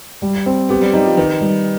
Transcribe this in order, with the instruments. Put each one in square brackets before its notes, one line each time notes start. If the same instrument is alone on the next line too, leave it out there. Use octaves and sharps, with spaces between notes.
[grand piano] G3
C4
[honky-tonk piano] B3 [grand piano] G4
[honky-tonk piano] G3
[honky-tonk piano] G3 [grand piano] D#4
[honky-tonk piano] F3
[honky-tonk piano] D#3 [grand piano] B4
[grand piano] G3